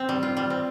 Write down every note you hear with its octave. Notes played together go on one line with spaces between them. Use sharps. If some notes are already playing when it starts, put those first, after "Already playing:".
Already playing: C4
G3
F4
G3
C4